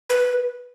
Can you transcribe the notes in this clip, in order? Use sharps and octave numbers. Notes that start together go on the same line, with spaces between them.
B4